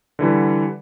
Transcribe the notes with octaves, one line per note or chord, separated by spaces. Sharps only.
D3 E3 G3